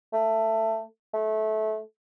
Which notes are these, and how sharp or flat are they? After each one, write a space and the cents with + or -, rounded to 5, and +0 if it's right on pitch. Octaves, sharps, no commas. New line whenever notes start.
A3 +15
A3 -20